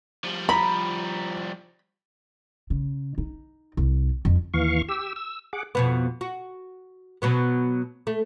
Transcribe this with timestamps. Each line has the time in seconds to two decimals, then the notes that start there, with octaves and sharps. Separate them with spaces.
0.24 F3 G3
0.49 A#5 B5
2.70 C#3
3.18 D#4
3.77 C2
4.25 F2
4.54 D#2 E3 F5 C#6
4.89 G4 E6
5.16 E6
5.53 G#4 F#5 D6
5.75 F2 B2 B3
6.21 F#4
7.22 B2 F#3 B3
8.07 A3